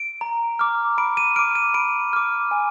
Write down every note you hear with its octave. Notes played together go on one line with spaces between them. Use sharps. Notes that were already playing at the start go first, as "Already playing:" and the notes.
Already playing: D7
A#5
D6 F6
B5 D7
D#7
D6 F6 D7
D#7
B5 D7
D6 F6
G#5